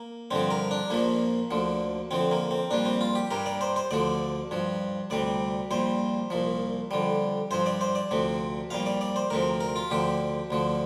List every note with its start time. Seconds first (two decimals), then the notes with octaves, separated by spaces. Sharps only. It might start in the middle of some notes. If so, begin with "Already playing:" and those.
Already playing: A#3
0.31 G2 D3 F3 C4
0.51 A#4
0.71 D4
0.90 A#1 A#2 F3 A#3
1.51 D2 D3 F3
2.11 F2 D3 F3 C4
2.31 A#3
2.51 C4
2.71 A#1 A#2 G3 D4
2.85 C4
3.01 F4
3.15 G4
3.31 G2 G3 A#4
3.46 D5
3.61 C5
3.76 C5
3.91 D2 D3 F3 D5
4.51 G2 F3
5.10 D2 C3 G3 D5
5.71 A#1 A#2 G3 C5
6.30 C2 A#2 F3
6.91 F2 D3 G3
7.51 G2 F3 C5
7.66 D5
7.81 C5
7.95 D5
8.11 D2 C3 F3
8.70 A#1 A#2 G3 F5
8.86 D5
9.01 D5
9.16 C5
9.30 D2 C3 F3 A#4
9.60 A#4
9.76 F4
9.91 D2 D3 F3 G4
10.51 D2 D3 F3